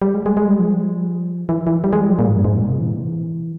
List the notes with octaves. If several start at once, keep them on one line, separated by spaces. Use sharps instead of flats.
G3
G#3
G#3
G#3
G3
F3
E3
E3
G3
G#3
G3
F3
A#2
G#2
G2
G#2
A#2
C3
E3